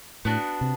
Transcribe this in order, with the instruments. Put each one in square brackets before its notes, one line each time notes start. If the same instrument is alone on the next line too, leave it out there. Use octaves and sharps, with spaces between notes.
[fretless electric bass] A2 [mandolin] B3 D4 F#4
[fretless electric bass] C3